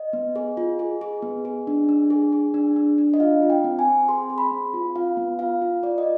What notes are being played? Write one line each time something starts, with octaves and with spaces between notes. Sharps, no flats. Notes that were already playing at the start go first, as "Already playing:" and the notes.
Already playing: D#5
B3
G#4
F4
G#4
G#4
B3
G#4
D4
D4
G#4
G#4
D4
D4
D4
D#5
F4 F5
F4
G5
C4
G#5
C4
G#4 C6
G#4
B5
C4
F4
F4 F5
B3
F4 F5
F4
F4 D5
D#5